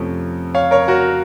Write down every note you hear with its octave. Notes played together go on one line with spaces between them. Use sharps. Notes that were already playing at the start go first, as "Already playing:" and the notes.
Already playing: F2 C3 F3 A3 C#4
C#5 F5
A#4 C#5
F#4 A#4